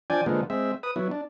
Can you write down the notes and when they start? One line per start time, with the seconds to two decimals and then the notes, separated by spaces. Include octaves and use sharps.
0.10 F3 D4 D5 G5 G#5
0.26 D3 F3 G#3 A#3 B3
0.50 G#3 C4 E5
0.83 B4 D#6
0.96 F#3 B3 E4
1.11 D4